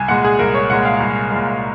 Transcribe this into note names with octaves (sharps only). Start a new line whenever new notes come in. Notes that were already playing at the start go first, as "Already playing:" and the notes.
Already playing: C2 G#5
A#2 G#3 F#5
G#4
C2 A#4
C#5
A#2 G#3 F#5
F5
C2
A#2 G#3